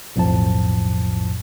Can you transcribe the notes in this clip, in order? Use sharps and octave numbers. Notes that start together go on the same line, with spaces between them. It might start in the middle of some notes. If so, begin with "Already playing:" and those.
B1 F2 A2 F3 A5